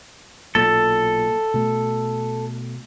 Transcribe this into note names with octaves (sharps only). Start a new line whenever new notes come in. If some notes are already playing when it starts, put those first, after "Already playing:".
B1 A#2 A4
B2 A3